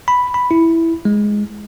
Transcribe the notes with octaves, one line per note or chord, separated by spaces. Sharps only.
B5
B5
E4
G#3